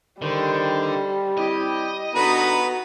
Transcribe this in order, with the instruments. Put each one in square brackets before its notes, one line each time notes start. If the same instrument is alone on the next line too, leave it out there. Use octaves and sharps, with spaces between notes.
[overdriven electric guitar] D3 [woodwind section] D#3 C5 [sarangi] G3
[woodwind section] C4 E4 G4 [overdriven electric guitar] D#5
[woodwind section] D3 A#5 B5 [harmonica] B3 D#4 B4 [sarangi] F#4